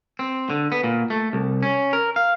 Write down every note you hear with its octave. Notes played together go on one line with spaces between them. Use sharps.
C4
D3
B3
A#2
A3
C2
C#4
A#4
F5